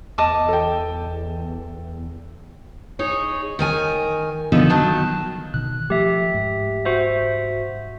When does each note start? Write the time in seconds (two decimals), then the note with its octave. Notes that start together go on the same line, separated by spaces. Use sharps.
0.18 E2 D#5 A5 D6
0.49 A4 G5
2.99 D#4 G#4 C#5
3.59 D#3 A#4 G#5
4.52 B2 D3 F3 B3 D#4 A4
4.69 D#3 F#3 A5
5.54 B2 D#3 F#6
5.90 F3 A3 G4 E5
6.34 G#2
6.85 F#4 C5 E5